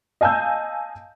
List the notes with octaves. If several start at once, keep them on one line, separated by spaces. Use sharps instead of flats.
D#5 F5 G#5 A5 E6 G6